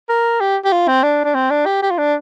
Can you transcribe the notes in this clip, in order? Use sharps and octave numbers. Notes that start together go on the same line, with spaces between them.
A#4
G4
G4
F4
C4
D4
D4
C4
D4
G4
G4
F4
D4